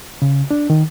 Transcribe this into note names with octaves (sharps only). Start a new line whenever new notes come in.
C#3
D4
D#3